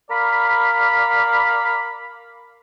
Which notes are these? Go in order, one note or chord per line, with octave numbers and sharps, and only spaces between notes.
A#4 D5 F5 B5